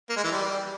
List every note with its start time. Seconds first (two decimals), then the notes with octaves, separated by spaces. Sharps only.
0.10 A#3
0.17 G#3
0.24 E3
0.31 G3